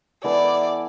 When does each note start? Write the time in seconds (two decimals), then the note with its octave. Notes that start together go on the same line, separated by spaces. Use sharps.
0.24 E3 B3 E4 A4 D5